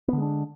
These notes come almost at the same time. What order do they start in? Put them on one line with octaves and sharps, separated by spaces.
B3 D3 G#3 D4